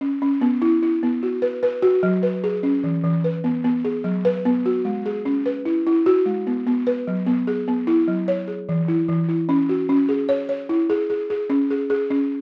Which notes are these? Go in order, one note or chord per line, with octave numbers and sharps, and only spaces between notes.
C#4
C#4
B3
E4
E4
B3
F#4
B4
B4
F#4
F#3
B4
G#4
C#4
E3
E3
B4
B3
B3
G#4
F#3
B4
B3
F#4
G#3
G#4
C#4
B4
E4
E4
F#4
G#3
B3
B3
B4
F#3
B3
G#4
B3
E4
F#3
C#5
G#4
E3
E4
E3
E4
C#4
F#4
C#4
G#4
C#5
C#5
E4
G#4
G#4
G#4
C#4
G#4
G#4
C#4